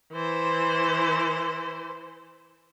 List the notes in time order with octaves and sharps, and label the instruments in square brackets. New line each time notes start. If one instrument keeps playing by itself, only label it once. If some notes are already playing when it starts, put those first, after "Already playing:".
[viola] E3 C5